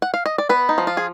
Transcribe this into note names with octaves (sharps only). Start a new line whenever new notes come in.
F#5
F5
D#5
D5
B3 B4
D#4
F3
F4
G#4